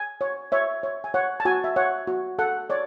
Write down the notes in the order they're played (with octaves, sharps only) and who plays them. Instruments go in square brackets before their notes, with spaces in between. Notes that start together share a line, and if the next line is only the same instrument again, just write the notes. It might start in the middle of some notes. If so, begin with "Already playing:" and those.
Already playing: [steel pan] G#5
C#5
C#5 E5
C#5
G#5
C#5 F#5
A5
F#4 G#5
E5
C#5 F#5
F#4
A4 F#5
C#5 D5